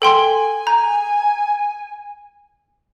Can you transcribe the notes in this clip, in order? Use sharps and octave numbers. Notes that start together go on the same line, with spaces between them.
A4 G5 G#5 C6
A#5 G6